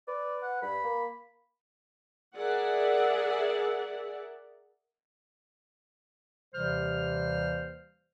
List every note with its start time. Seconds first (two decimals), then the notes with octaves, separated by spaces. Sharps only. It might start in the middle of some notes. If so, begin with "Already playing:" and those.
0.08 B4 D5
0.43 F#5
0.62 G2 B5
0.84 A#3
2.35 G#4 A#4 D5 E5 F#5
6.55 D#2 C3 E3 G3 C5 F6